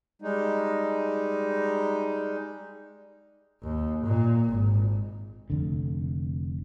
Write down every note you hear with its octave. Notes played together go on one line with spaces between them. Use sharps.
G3 G#3 D#4
D#2
A#2
G#1
F1 D3